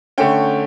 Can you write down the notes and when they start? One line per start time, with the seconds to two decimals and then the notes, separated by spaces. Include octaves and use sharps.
0.18 D3 A3 C#4 G5